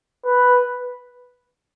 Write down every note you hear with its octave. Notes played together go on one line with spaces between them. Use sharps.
B4